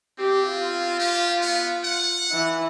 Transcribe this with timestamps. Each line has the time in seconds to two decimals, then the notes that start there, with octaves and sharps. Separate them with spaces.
0.19 C4 G4
0.50 F4
0.99 G4
1.41 B3
1.84 F#5
2.32 E3